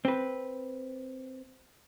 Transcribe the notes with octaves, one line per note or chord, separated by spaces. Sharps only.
C4 B4